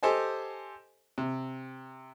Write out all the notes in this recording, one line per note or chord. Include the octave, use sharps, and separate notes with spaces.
G4 A4 C5 D#5 G#5
C3